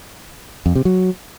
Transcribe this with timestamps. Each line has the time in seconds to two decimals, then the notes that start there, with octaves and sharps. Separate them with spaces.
0.66 F2
0.75 C3
0.85 F#3